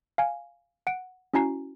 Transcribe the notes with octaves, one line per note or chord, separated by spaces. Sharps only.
F5 G#5
F#5 D7
C#4 E4 F#4 G#5 A#5 C7